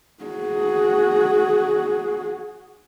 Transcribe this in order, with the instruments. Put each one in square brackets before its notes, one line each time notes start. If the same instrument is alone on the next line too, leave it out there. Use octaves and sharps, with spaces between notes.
[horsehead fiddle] F#4 G#4